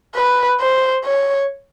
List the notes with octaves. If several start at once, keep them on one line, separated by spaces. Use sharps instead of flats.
B4
C5
C#5